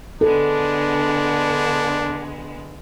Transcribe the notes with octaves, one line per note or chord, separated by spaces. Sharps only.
D3 G#3 B3 D4 A4